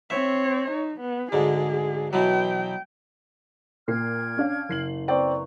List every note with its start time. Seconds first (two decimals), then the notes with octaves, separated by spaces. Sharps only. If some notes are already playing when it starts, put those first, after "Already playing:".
0.10 C4 C#5 E5
0.71 D#4
1.00 B3
1.32 D2 G#2 D3 G#4
2.13 B2 E3 F#3 G5
3.88 A#2 G5 F6 G#6 C7
4.37 C#4 D4 F5
4.69 F#1 C7 F#7
5.08 C4 B4 D5 G5 A#5 C#6